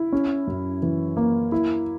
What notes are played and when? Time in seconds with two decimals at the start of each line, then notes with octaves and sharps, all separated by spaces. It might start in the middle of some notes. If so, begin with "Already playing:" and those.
Already playing: E4
0.13 C#4
0.47 F#2
0.82 E3
1.17 A#3
1.52 E4